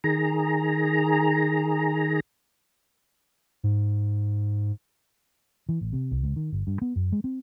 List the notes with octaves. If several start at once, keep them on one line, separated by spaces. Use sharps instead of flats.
D#3 G#4 A#5
G#2
E3
A1
C3
C2
C#2
D#3
G1
G2
B3
F#2
G#3
C4